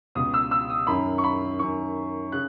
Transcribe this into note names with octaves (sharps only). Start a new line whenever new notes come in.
C#2 B2 D#6
E6
E6
D#6
F#2 D#3 B5
C#6
B5
F#2 D#3 C#6
C#3 F#6